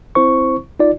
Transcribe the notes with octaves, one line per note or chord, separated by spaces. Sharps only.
C4 E4 C5 C#6
D#4 F4 D5